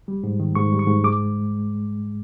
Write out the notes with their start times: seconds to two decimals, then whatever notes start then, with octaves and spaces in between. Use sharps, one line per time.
0.08 G3
0.24 G#2
0.40 D#3
0.55 G#2 C#6
0.72 G3
0.79 C#6
0.87 G#2
1.04 G#3 D6